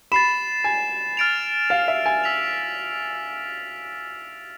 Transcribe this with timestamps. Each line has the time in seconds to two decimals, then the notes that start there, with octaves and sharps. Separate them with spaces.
0.12 B5 A6 C7 E7
0.64 G#5
1.17 F6 A6 D7 F7
1.70 F5
1.88 E5
2.06 G#5
2.24 E6 B6 F7